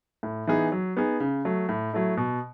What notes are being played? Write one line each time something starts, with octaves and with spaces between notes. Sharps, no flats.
A2
E3 B3 D#4 G#4
F#3
B3 D#4 G#4
C#3
F#3 A3
A2
F#3 A3 E4
B2